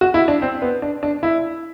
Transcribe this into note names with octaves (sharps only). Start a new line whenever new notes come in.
F#4
E4
D4
C4
B3
D4
D4
E4